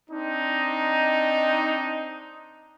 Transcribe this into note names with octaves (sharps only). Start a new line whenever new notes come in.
C4 D4 D#4